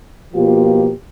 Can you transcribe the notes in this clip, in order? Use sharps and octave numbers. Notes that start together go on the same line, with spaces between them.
B2 F3 A#3 F4 G4